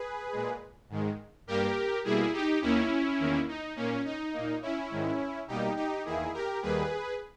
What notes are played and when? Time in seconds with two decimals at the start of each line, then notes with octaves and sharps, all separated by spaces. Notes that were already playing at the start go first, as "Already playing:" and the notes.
Already playing: G#4 B4
0.33 A#2 G#3
0.89 G#2 D#3 G#3
1.47 G2 G3 A#3 G4 A#4
2.04 B2 G3 A#3 E4 G#4
2.33 D#4 G4
2.62 D#2 D#3 A#3 C#4 E4
3.19 E2 D#3 A#3
3.48 D#4
3.76 A#2 A#3 C#4
4.05 D#4
4.33 A#2 A#3
4.62 C#4 E4
4.90 G#2 D#3 G#3
5.48 B2 G3 A#3 D#4 G4
5.77 D#4 G4
6.05 E2 D#3 A#3 E4 G#4
6.34 G4 A#4
6.62 D#2 D#3 G3 A#3 G#4 B4